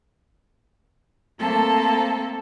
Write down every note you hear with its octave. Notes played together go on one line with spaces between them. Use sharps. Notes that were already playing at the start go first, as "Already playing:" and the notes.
A3 A#3 C4 A4 A5